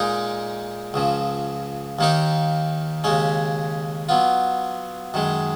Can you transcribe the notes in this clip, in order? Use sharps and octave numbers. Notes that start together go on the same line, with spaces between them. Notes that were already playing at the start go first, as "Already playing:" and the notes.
Already playing: A#2 G#3 D#4 A#4
C#2 C#3 F3
D#2 D#3 A#3 D#4 A#4
D#2 C#3 G#3 C#4
F#3 B3 F4
F#2 D#3 G#3